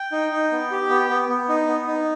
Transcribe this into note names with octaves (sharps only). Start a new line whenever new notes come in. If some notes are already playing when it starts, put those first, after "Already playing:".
Already playing: G5
D#4
D#4
B3
G4
B3
B3
B3
D#4
B3
D#4